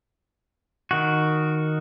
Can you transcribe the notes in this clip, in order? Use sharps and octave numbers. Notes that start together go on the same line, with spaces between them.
D#3 F#4